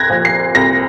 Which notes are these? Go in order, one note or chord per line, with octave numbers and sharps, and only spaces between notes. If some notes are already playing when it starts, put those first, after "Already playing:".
Already playing: C2 F#6 G#6 A#6
A#2 F3
C7
C2 A#6